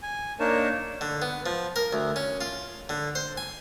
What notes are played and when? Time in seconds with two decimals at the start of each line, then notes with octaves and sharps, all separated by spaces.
0.03 G#5
0.40 A#3 D4 D#4 A#4 C#5 A5
1.01 D3
1.22 B3
1.46 F3
1.76 A#4
1.93 D2
2.16 C#4
2.41 F4
2.89 D3
3.15 C5
3.37 G#5